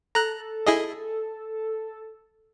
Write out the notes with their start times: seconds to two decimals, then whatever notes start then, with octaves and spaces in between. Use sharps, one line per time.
0.15 A4 A#5 F#6
0.66 E4 G#4 D#5